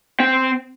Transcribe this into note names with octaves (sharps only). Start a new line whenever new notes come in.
C4